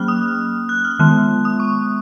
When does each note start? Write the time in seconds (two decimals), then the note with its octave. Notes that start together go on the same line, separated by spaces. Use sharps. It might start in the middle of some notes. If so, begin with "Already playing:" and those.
Already playing: F#3 A#3 C#4 F6 F#6
0.08 D#6
0.69 F#6
0.85 F6
0.99 D#3 G#3 B3 F#6
1.45 D#6
1.60 C#6